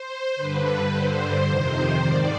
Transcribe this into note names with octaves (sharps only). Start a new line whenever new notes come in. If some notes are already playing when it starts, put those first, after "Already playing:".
Already playing: C5
G2 D3 B4
G2 D3 C5
F2 C3 D#3
G#2 D#3 D5